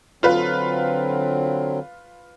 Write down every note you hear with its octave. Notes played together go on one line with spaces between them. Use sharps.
D3 F#3 C4 F4 B4